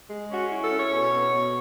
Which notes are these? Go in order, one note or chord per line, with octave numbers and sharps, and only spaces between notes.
G#3
C#4 F#4
E4
A4
C#4 C#5
B2
B2
B2